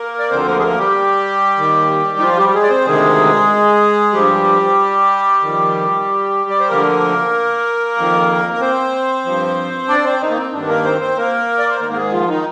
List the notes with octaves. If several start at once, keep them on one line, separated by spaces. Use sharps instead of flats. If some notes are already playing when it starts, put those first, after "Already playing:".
Already playing: A#3 A#4
D5
D2 D3 F3 C4 C5
A#3 A#4
G#4
A#3 A#4
G3 G4
D#2 D#3
D#4
F3 F4
G3 G4
G4
G#3 G#4
D5
C4 C5
D2 C3 D#3 G#3 G#4
G2 F3 G3 G4
F2 D#3
D5
C5
D2 D3 F3 A#3 A#4
F2 D#3
A#4
C4 C5
G2 F3
D4 D5
C4 C5
D#3 D#4
A#3
C4
G2 D3 D#3 D4
A#3 A#4
C4 C5
C4 C5
A#3 A#4
D5
C5
G#2 D#3 A#3 A#4
A#4
G#3 G#4
F3 F4
D#3 D#4